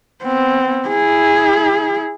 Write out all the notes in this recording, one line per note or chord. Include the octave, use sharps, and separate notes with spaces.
B3 C4
E4 G#4